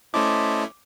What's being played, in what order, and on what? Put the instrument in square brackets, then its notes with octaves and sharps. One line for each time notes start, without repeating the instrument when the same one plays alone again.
[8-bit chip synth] A3 C#4 E4 [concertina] C5 D#5 A5 [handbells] D6